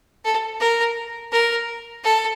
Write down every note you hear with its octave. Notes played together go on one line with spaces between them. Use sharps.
A4
A#4
A#4
A4